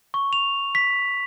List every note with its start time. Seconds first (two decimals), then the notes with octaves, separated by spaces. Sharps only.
0.14 C#6
0.33 F7
0.75 B6